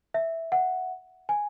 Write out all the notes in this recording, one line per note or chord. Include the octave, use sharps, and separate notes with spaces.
E5
F#5
G#5